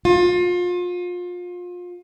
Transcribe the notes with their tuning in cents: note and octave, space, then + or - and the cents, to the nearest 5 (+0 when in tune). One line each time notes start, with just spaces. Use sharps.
F4 +30